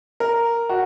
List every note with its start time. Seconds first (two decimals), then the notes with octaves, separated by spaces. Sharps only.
0.20 A#4
0.69 F#4